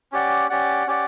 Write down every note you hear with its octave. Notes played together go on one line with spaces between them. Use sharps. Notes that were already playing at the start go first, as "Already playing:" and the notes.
C#4 G4 D5 F#5
C#4 G4 D5 F#5
C#4 G4 D5 F#5